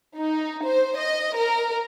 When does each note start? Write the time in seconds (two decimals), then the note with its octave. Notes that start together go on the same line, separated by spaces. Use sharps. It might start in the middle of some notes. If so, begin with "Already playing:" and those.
0.17 D#4
0.64 C5
0.98 D#5
1.36 A#4